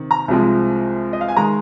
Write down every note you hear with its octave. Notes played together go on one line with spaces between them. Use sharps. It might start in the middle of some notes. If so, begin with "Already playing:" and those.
Already playing: C3 D#3
A#5
C2 C3 F3 G#3
D#5
F5
G#5
D#3 G#3 A#5